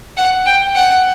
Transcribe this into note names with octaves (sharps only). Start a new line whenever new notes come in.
F#5
G5
F#5